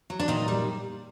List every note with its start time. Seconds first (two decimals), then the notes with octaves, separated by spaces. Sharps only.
0.10 F#3
0.19 D4
0.28 A#2 D#3 D#4
0.48 G3